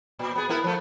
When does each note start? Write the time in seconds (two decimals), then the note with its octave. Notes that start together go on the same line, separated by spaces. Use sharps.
0.19 A#2
0.36 B3 G#4
0.49 B3 E4 A#4
0.64 F3 A3